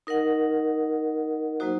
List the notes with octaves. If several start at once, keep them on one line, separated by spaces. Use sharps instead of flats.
D#4 A#4 D#5 F#5
F#3 A#3 D#4 F#4 C5